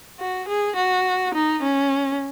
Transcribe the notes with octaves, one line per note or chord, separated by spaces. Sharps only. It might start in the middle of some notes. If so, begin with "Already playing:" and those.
F#4
G#4
F#4
D#4
C#4